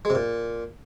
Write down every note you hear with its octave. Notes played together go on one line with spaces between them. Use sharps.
G#3
C3
A#2